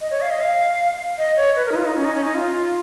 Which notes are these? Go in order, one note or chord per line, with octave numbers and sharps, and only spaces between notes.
D#5
C#5
F5
D#5
F5
D#5
C#5
B4
A#4
D#4
F4
D#4
C#4
D#4
C#4
D#4
F4